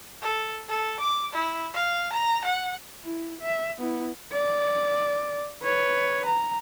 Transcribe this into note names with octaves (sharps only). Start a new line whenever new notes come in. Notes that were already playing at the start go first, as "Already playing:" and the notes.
A4
A4
D6
E4
F5
A#5
F#5
E4
E5
B3 E4
D5
B4 C#5
A#5